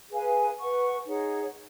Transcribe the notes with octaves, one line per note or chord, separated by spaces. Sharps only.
G#4 B4 F5 G#5
B4 F#5 C#6
D#4 G#4 C#5 F#5